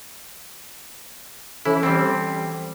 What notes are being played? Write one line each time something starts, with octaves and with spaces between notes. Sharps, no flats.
E3 C#4 E4 A4
G3 C4